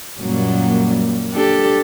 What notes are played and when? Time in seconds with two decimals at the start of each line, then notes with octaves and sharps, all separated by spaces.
0.20 F#2 A#2 F#3 G3 A#3
1.32 D4 G4 A4